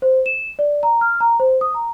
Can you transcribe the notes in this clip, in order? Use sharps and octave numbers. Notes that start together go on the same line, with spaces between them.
C5
E7
D5
A#5
F6
A#5
C5
D#6
A#5